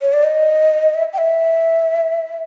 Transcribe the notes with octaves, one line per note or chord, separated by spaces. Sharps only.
C#5
D5
D#5
E5
G5
E5